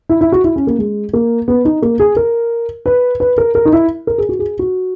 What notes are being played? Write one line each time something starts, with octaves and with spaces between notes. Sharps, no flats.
E4
E4
F#4
E4
C#4
A#3
G#3
A#3
B3
D#4
A#3
G#4
A#4
B4
B4
A#4
A#4
D#4
E4
A#4
G#4
F#4
G#4
F#4